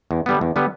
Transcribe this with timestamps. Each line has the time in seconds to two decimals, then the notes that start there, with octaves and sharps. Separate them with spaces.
0.11 E2
0.26 D3 G3 B3
0.41 E2
0.56 D3 G3 B3